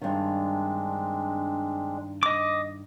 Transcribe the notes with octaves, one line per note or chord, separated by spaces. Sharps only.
G2 D#3 G#3 C4 D4
D#5 D6